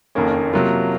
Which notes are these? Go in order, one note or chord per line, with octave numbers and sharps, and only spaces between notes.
F#1 F2 D#3 A#3 C#4
C3 F#3 A#3 F4